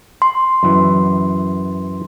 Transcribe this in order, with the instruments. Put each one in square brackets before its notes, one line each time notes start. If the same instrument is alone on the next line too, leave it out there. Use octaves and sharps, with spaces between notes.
[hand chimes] C6
[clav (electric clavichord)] F#2 E3